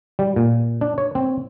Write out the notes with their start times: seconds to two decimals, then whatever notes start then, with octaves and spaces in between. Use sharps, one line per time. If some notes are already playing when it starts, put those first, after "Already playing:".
0.19 G3
0.36 A#2
0.81 D4
0.98 C#5
1.15 C4